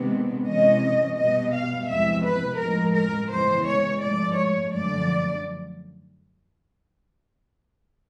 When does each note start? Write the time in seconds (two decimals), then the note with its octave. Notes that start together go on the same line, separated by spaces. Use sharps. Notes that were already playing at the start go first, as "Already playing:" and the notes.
Already playing: C3 D#3 G#3 B3 D4
0.46 C3 E3 G#3 C#4 D#5
1.17 B2 G3 B3 D#5
1.53 F5
1.88 E2 C3 F3 G#3 E5
2.24 B4
2.59 A2 F3 G#3 A#4
2.94 A#4
3.30 E2 C#3 E3 G#3 C5
3.65 C#5
4.01 G#2 F3 A3 D5
4.36 C#5
4.71 F#2 D3 F3 A3 D5